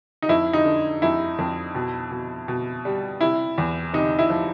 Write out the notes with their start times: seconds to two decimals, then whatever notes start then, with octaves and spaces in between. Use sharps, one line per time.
0.22 D#4
0.29 F2 E4
0.53 D#4
0.65 D3
1.02 F2 E4
1.39 F2
1.75 B2
2.11 B2
2.48 B2
2.85 G3
3.21 C3 E4
3.58 E2
3.93 C3 D#4
4.19 E4
4.30 F3